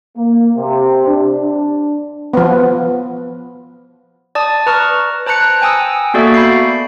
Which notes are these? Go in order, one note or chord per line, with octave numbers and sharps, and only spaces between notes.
A#3
C3
D4
F3 B3
D5 A5 D#6
B4 A#5 C#6 F6
C5 A5 A#5 F#6 C#7
G5 G#5 A#5 D#6 E6
A#3 B3 F#4 A4 D5 E5
B5 G6 C7